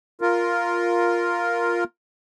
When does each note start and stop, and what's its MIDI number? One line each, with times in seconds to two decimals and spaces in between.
0.21 1.84 65
0.21 1.84 70